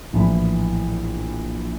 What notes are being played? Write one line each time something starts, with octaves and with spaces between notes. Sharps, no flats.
A#1 A2 E3 B5